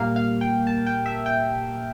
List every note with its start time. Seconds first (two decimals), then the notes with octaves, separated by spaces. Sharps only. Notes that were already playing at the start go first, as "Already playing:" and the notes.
Already playing: A#2 G3 A#3 F5
0.16 F5
0.41 G5
0.67 A5
0.86 G5
1.06 E5
1.26 G5